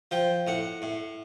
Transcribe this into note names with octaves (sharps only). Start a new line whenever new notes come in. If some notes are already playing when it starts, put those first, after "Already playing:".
F3 G5
A2 F#5
A2